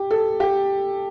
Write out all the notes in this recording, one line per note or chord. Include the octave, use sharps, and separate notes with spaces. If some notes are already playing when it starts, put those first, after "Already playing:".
Already playing: G4
A4
G4